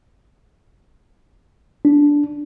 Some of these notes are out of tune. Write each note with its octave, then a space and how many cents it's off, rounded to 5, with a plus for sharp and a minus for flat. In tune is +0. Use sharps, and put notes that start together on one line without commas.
D4 -10